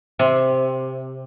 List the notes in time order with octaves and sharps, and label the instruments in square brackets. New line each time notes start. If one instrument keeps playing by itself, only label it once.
[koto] C3